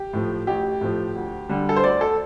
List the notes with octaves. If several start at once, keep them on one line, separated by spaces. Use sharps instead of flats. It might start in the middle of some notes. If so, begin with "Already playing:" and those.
Already playing: G4
A2 F3
A1 G4
A2 F3
D2
D3 G3
A4
C5
D2 D5
A4